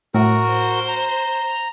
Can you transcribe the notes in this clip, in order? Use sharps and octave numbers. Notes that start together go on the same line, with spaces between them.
A2 F#4 A#4
C5
A#5